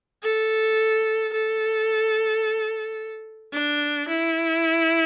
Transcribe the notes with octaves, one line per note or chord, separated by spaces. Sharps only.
A4
A4
D4
E4